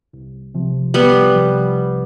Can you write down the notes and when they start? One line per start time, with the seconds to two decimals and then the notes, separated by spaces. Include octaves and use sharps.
0.14 C2
0.55 C3 F3
0.94 C2 G3 B3
1.35 C3 F3
1.75 C2